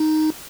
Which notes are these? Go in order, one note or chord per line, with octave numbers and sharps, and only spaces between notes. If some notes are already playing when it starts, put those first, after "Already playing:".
Already playing: D#4